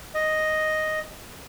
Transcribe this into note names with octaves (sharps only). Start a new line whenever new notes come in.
D#5